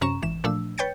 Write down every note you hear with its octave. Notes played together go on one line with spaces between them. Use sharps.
F#2 C3 C#4 A#5 C#6 E7
G#1 E3 E7
A#2 F3 A3 D4 E6
B4 C#5 G5 G6 A6 C#7